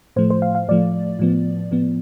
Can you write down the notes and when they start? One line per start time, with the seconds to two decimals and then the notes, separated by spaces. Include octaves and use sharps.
0.16 A2 F3 A3 C5
0.30 C5
0.42 F5
0.55 F5
0.68 A2 F3 A3 D5
1.19 A2 F3 B3
1.71 A2 F3 B3